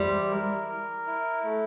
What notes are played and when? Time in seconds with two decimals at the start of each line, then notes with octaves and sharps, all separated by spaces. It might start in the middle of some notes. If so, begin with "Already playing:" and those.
Already playing: G3 E4 C5
0.31 A#4
0.69 A#4
1.07 E4
1.44 A3